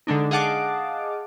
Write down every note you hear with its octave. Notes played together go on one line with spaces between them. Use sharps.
D3 G#3 D4 D#4
G#4 D#5 F5 F#5 A5 D6